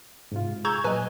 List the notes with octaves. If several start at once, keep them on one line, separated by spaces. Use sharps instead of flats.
G#2 C3 F4
G#4 A#5 C#6 E6 G6 G#6
A#2 F#3 B4 D#5 G#5